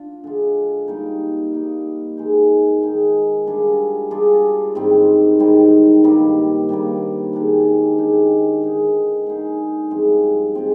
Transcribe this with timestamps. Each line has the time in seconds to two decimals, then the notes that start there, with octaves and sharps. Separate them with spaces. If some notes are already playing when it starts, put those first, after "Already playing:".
Already playing: D4 F4
0.24 D3 G#3 D4 F4
0.88 G3 A#3 D#4
1.53 G3 A#3 D#4
2.17 D#3 G#3 D#4
2.82 D#3 G#3 D#4
3.47 G3 D4 F4 G#4
4.11 G3 D4 F4 G#4
4.75 G#2 D#3 G3 C4
5.39 G#2 D#3 G3 C4
6.04 G2 D#3 G3 A#3
6.69 G2 D#3 G3 A#3
7.33 D#3 G#3 D4 G4
7.98 D#3 G#3 D4 G4
8.62 D3 G#3 D#4 G#4
9.26 D3 G#3 D#4 G#4
9.91 G2 F3 G#3 C4
10.55 F3 G#3 C4